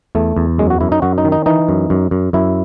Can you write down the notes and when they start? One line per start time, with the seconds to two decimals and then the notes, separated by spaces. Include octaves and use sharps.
0.15 E2 A3
0.37 E2
0.58 F#2 G#3
0.70 F#4
0.81 F#2 E4
0.92 D#4
1.02 F#2 F#4
1.18 D#4
1.25 D#3
1.32 D#4
1.46 E3 D#4
1.69 F#2
1.90 F#2
2.11 F#2
2.33 F#2 E4